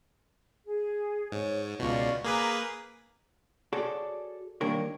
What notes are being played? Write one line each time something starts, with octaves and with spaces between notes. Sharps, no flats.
G#4
G#2 C#5
C#2 B2 F4 D5 C#6
A#3 G#4 B4 A#5 D6
F#4 G#4 A4 C#5 D5
D#3 G3 A#3 D4 A#4 C#5